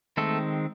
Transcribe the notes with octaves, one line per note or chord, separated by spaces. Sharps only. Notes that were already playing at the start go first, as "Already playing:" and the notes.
D#3 G#3 A3 C4 A4